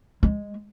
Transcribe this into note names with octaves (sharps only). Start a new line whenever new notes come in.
G#3